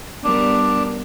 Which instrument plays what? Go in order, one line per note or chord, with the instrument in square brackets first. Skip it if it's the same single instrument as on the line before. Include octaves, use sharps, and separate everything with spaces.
[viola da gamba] G3 B3 A#4 [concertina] D4